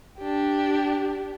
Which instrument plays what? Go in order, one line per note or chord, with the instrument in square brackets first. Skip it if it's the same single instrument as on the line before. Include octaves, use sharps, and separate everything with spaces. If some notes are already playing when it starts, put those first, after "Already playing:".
[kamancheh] D4 G4